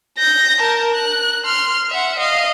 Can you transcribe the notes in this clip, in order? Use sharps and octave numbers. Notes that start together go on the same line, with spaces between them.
G6 A#6
A#4 A5
F#6
C6 F6
E5 F#5
D#5 F5